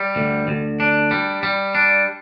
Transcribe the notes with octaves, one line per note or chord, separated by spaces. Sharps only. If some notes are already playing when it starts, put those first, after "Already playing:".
Already playing: G3
D2
D2
D4
G3
G3
D4